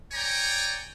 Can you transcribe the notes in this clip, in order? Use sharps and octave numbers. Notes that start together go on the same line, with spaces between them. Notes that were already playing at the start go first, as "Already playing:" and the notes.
C#5 D5 G5 G#5 A#5